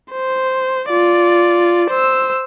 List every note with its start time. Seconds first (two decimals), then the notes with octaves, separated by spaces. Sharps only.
0.13 C5
0.90 F4 D5
1.90 C5 E6